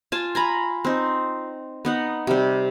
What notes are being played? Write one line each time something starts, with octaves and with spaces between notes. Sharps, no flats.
F4 G#5 A5
G#5 A#5 B5
C4 D#4
B3 D#4 F#5
C3 G3